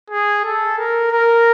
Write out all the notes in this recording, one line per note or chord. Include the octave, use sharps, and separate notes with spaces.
G#4
A4
A#4
A#4